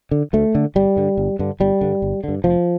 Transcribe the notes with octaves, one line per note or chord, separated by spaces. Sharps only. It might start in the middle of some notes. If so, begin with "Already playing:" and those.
D3
D2 A3
D3
G1 G3
G2 D3
G1
G2 D3
G1 G3
G2 D3
G1
G2 D3
F1 F3